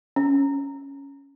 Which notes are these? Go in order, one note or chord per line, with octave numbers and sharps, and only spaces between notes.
C#4